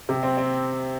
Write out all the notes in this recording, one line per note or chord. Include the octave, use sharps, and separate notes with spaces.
C3
C4
C4